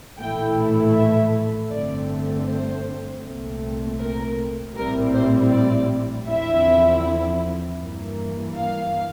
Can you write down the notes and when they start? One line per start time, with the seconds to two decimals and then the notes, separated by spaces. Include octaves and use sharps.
0.20 A#1 A2 E3 A3 E4 G5
0.95 E5
1.72 G1 G2 D3 A3 C4 D5
2.47 C5
3.24 C2 A#2 A3 C4
4.00 A#4
4.76 A#1 A2 G3 C4 E4 A#4
5.14 C5
5.52 D5
6.28 E2 D3 F3 C4 E4 E5
7.80 G2 E3 A#3
8.56 F5